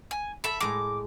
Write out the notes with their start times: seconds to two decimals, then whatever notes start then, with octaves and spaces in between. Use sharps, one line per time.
0.11 G#5
0.44 A4 E5 B5
0.61 A2 G#3 A#5 D6